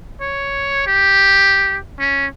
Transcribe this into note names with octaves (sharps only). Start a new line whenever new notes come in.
C#5
G4
C#4